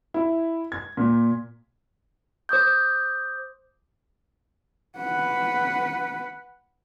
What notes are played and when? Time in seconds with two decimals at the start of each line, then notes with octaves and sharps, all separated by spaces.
0.14 E4
0.72 G#6
0.97 A#2
2.49 C5 D6 D#6 G6
4.98 B4 F#5